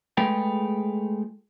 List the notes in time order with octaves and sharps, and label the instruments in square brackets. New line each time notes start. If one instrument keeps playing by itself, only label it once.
[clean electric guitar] G#3 A3 F4 G#4 B4 G5